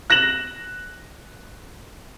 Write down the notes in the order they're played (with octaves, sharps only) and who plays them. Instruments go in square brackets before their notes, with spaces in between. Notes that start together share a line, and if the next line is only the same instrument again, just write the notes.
[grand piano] F#6 A#6 E7 F#7